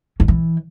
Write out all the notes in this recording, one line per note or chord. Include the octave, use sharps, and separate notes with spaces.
D#3
E3